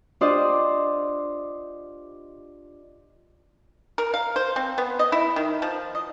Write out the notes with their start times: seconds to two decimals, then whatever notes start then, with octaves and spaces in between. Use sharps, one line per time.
0.21 D4 F4 G4 C5 D5 D#5
3.98 A#4
4.14 F5
4.36 C5
4.56 C4
4.78 B3
4.99 D#5
5.12 E4
5.36 D#3
5.62 F3
5.95 D#5